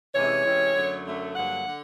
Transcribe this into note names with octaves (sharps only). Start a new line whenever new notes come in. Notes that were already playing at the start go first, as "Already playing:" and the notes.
C3 E3 G#3 C#4 E4 C#5
C3 E3 G#3 C#4 E4
F#2 D3 F#3 A3
F#2 D3 F#3 A3
G2 D3 F#3 A#3 F#5
D3